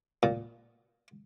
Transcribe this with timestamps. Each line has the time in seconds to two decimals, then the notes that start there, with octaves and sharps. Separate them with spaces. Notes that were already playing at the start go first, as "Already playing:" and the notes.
0.23 A#2